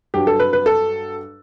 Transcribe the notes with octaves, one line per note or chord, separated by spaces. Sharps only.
G2 F#3 G4
A4
B4
B4
A4